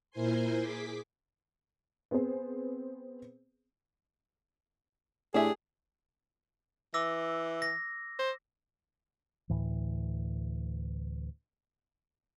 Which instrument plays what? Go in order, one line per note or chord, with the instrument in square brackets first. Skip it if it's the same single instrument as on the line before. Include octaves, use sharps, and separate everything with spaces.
[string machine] A#2 E4 A#4 C5 G#5 C6
G#4 D6 B6
[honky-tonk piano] B3 C4 G#4 C5
[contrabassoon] A2 [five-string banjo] D4 E5 [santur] G4 G#5 [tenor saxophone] G#4
[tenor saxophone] E3 [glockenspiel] D6 E6 A#6
[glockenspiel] A#6
[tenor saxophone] C5
[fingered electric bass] D2 A2 E3